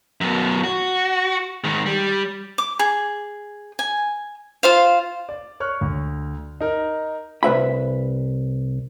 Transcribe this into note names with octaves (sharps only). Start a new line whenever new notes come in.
F#2 B2
F#4
G#2 D#3
G3
D6
G#4
G#5
F4 C5 F5
D5
C#5 C#6 F6 F#6
D2
D#4 A#4
C2 B4 E5 B5